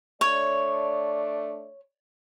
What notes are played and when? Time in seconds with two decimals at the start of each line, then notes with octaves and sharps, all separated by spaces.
0.21 A3 D4 C#5 D5